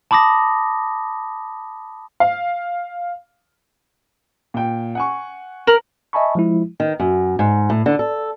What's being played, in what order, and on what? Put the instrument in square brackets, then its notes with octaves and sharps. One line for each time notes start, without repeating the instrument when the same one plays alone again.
[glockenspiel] A5 B5 D6 D#6 A#6
[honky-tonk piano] F5
[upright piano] A#2 G5
F#5 G#5 C#6
[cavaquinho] A#4 [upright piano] F#7
[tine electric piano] D#5 E5 G#5 A5 B5 C#6
F3 G#3 E4
[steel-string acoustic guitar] D#3
F#2
G#2
A2
D3
A4